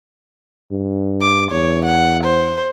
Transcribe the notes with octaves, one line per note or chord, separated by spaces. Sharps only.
G2
D6
E2 C#5
F#5
C5